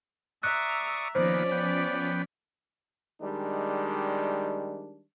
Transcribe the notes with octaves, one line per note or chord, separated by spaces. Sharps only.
D5 E5 A#5 C#6 D#6 F#6
D#3 F3 A#3 B3 C#4 C5 D5 B6
B3 G5
D#3 G3 G#3 D4